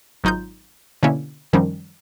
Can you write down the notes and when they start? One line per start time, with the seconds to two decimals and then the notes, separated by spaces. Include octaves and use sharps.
0.24 G#1 F#3 D#4 F4 G6
1.03 B2 D3 A#3 C#4 E4
1.53 F#2 D#3 F3 G3 C#4